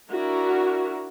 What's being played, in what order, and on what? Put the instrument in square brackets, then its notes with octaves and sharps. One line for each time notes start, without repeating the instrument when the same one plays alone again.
[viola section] D4 E4 F#4 A#4